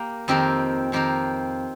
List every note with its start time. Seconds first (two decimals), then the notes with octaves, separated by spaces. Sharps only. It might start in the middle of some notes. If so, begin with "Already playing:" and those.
Already playing: A#3 G4 A#4
0.28 F2 D#3 C4 G4 A#4
0.92 F2 D#3 C4 G4 A#4